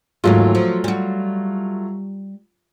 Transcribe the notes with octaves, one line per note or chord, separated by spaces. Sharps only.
D#2 G#2 E3 F#3 A3 F4
F3
G3 F#4